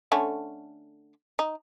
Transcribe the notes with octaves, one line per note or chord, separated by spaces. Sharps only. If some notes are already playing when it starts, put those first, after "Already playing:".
D3 A3 C#4
D#4